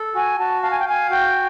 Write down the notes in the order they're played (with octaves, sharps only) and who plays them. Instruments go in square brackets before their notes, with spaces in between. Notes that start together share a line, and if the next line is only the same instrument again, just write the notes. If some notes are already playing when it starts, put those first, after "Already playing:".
Already playing: [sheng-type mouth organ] A4
[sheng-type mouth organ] F#4 [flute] G#5
[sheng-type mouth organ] F#4 [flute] A5
[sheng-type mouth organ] F5 [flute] A5
[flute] G#5
G5
[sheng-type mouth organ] F5 [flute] G#5
[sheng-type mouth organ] F#4 [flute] G5